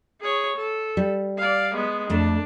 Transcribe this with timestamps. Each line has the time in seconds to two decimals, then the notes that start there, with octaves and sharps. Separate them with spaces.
0.21 G#4 C#5
0.56 A4
0.97 G3
1.38 D5 F5
1.74 G#3 B3
2.10 F2 A3 D4